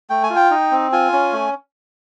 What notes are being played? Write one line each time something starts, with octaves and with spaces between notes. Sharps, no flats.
A3 G5
G#5
F4
G5
D#4
C4
F4 G#5
C#4
A3